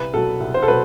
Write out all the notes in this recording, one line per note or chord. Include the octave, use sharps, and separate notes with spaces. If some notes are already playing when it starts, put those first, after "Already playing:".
Already playing: C2 B4
B2 F#3 A4
C2
C5
A4
B2 F#3 B4